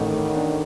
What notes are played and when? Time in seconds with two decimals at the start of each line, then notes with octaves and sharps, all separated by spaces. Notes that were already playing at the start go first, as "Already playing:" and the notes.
Already playing: A1 A2 D#3 A3
0.13 A2
0.35 D4